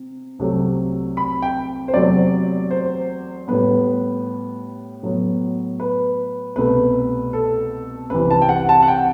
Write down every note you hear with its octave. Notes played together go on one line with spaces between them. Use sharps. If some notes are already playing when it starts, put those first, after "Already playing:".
Already playing: C3
C2 C3 F#3 A3
B5
G5
C5
E2 C3 F#3 A3 D5
C5
A2 G3 B3 B4
A2 F#3 B3
B4
C2 B2 A3 B4
A4
C2 C3 E3 B4
A5
G5
F#5
A5
F#5
G5